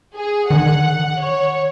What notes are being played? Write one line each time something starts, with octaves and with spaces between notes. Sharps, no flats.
G#4
D#3 F#5
C#5